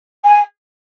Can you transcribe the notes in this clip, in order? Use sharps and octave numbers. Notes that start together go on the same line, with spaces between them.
G#5